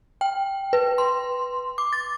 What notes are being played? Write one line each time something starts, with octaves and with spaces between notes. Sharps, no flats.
G5
B4
C6
D6
A6